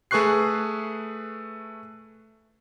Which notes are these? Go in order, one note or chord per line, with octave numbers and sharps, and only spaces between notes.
A3 G#4 B4 C#6 F#6 C7